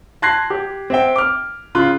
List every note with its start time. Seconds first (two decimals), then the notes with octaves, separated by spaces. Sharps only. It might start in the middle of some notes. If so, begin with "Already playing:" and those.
0.22 A5 C6 F#6 G#6 A#6 C7
0.50 G4
0.90 C4 E5 G5
1.16 D6 F6
1.75 C#3 F4 C6 F#6